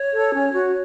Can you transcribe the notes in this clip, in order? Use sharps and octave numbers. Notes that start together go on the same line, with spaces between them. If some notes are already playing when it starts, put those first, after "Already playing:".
Already playing: C#5
A4
C#4
F#4